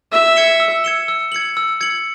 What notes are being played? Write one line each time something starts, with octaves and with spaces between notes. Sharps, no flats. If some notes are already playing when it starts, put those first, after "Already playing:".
E5 E6
G#6 C#7 E7 G7
E6
G#6 C#7 E7 G7
E6
G#6 C#7 F#7
E6
G#6 C#7 F#7